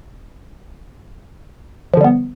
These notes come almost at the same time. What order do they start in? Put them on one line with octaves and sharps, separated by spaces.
F3 D3 G3 B3